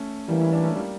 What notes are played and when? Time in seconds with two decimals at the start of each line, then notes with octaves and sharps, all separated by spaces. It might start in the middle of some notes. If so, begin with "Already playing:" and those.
Already playing: A3 C#4
0.29 E3 G3 A#3
0.40 C#4 E4
0.53 A#3 D4
0.64 A3 C#4
0.76 G3 A#3